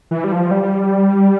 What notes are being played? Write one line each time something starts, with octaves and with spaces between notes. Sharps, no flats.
E3
G3
F3
G3